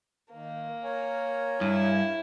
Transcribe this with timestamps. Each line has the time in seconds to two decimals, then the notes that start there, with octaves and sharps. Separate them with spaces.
0.33 D#3 A#3
0.84 A#4 C#5 G#5
1.61 G2 E4